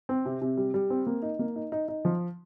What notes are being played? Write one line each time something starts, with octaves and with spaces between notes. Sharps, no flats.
C4
C3
C3
G3
G3
C4
A#3
D#4
A#3
D#4
D#4
D#4
F3